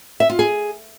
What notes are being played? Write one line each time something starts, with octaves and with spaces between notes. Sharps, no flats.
E5
F4
G#4